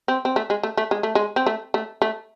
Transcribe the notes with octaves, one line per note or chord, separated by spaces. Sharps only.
C4
C4
A3
G#3
A3
A3
G#3
A3
G#3
C4
A3
A3
A3